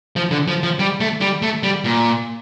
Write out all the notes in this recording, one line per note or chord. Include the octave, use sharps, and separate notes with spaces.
F3
D3
F3
F3
G3
A3
G3
A3
G3
A#2